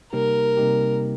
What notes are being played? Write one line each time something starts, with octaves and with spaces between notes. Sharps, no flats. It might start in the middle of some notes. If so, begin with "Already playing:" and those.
C3 G3 A#3 D#4 G4 A#4
C3 G3 A#3 D#4 G4